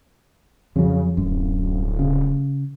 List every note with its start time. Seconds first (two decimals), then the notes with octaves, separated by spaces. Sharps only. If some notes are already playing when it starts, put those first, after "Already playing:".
0.76 F2 C#3 F#3
1.17 D1 F#2
1.99 C#3